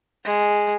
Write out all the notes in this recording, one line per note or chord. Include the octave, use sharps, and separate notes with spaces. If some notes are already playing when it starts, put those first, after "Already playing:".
G#3